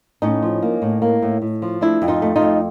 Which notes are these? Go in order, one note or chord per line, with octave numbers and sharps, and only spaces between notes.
A2 C#4 D#4
F3
A#3
A2
A#3
A2
A2
F3
A3 D4 E4
F2
D#4 F4
A3
D#4 F4
F2